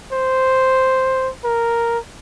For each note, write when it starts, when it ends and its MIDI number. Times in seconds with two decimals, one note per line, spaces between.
0.12 1.30 72
1.44 1.98 70